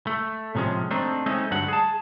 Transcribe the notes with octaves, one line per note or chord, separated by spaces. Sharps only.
A3
A2 C3 F3 G#3 C#4
A3 C4 D4 D#4
G#3 A3 C4 C#4 D#4
D2 G2 D3 F#3 G3 F#5
G#4 A5